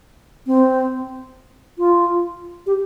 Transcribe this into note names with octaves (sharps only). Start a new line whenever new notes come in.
C4
F4
G4